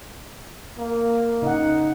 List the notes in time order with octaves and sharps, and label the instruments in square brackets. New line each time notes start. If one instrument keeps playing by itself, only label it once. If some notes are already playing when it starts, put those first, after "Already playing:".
[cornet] A#3
[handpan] C#3 F#5 [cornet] D#4